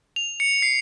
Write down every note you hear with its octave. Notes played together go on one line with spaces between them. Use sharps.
F7
C#7
C7